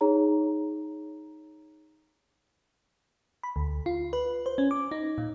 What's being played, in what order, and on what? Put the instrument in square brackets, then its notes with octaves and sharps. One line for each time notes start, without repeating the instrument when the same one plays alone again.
[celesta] D#4 G#4 C#5 A#5
[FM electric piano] B5
D2
F4
B4
C5
C#4
D6
D#4
A#2